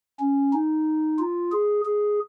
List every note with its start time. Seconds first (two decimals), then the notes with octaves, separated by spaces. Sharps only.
0.20 C#4
0.53 D#4
1.19 F4
1.52 G#4
1.85 G#4